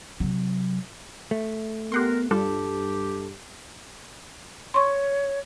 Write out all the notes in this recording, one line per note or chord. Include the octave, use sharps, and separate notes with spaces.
C3 F#3
A3
B3 G4 A#4 F#5 C6
G2 G3 D4 F4 G4 A4
C#5 C6 C#6